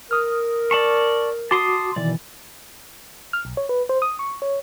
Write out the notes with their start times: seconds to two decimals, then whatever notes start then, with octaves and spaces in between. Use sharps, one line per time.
0.11 A#4 D#6 F6
0.71 D5 A5 C#6
1.51 F#4 A5 C6 D6 D#6
1.96 B2 D#3 E3 D5
3.33 F6
3.45 B1
3.57 C#5
3.69 B4
3.89 C5
4.02 D#6
4.19 C#6
4.42 C#5